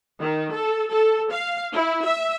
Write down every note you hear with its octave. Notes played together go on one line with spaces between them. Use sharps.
D#3
A4
A4
F5
E4
E5